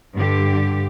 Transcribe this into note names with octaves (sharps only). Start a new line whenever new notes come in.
G2 D3 G4